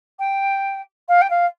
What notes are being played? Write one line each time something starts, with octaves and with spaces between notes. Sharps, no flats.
G5
F5
G5
F5